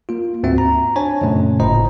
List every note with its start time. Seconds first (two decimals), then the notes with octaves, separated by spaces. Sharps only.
0.09 A#3 F4
0.43 D2 G#2 C4 F#4 E5
0.58 A#5
0.96 D4 C5 C#5 G#5 A5
1.21 F#2 A#2 C#3 A3 C#4
1.60 G1 A2 C5 D#5 A#5